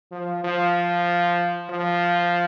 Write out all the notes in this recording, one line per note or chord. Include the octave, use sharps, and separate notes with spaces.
F3
F3
F3